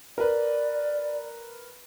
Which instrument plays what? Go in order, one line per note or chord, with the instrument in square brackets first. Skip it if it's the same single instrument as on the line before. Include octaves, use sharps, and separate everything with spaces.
[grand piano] A#4 B4 [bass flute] D5